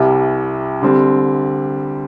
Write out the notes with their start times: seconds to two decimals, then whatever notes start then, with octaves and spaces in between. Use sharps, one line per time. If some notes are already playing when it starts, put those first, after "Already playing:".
Already playing: C2 C3 G3
0.82 D3 G3 C4